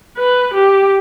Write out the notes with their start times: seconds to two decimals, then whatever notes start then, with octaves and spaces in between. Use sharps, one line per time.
0.17 B4
0.54 G4